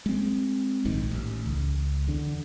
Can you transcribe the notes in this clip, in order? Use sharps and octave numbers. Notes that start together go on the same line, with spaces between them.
G#3 C4
A#1 G#2 D#3
A1
C#2
E2 D3